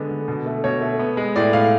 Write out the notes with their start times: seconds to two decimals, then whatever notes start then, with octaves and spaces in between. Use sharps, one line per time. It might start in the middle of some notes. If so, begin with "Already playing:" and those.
Already playing: D3 G#3 B3
0.11 D3
0.28 B2
0.46 A3
0.64 B2 C#5
0.81 A3
0.99 B3
1.17 G#3
1.36 A2 D5
1.53 A2 F5